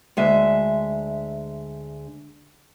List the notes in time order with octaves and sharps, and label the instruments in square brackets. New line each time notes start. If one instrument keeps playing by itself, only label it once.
[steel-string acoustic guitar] D2 G#3 E5